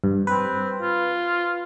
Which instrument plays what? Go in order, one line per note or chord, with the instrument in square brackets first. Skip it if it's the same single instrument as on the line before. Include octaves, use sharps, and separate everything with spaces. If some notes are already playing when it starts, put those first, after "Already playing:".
[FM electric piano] G2
[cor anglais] C4 [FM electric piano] B4
[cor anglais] F4